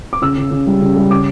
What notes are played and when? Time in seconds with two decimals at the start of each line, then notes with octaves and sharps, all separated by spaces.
0.13 D6
0.22 C#3 E6
0.37 C#3
0.51 C#3
0.67 G3
0.81 C#3
0.96 G3
1.10 C#3 D6